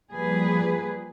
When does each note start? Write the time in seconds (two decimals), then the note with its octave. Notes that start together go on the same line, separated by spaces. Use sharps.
0.10 F3 G3 A#3 G#4 B4